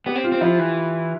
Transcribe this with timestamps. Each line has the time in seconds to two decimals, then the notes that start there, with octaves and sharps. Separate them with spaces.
0.06 B3 G4
0.15 C4
0.24 F4
0.32 C4
0.41 F3 E4
0.59 E3